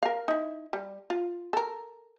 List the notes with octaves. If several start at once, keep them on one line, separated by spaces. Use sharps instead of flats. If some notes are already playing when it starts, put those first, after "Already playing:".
A#4 F5
D#4 E4
G3
F4
A4 A#4